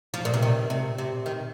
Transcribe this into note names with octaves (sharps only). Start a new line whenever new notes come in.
F3
A#2
C3
D#3
C3
C3
D#3